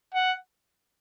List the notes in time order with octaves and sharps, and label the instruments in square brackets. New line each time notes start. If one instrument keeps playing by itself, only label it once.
[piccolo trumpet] F#5